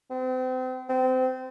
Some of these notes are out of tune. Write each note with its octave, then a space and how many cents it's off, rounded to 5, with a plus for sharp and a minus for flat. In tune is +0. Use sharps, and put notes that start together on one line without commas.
C4 -35
C4 -25